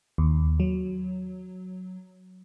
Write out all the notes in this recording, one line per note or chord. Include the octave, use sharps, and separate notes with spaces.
D#2
F#3